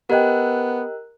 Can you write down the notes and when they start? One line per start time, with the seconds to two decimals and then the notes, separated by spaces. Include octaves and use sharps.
0.10 B3 G4 A#4 D#5 G5 F#6